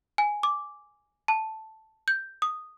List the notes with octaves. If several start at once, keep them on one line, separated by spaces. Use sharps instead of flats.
G#5
D6
A5
G6
D#6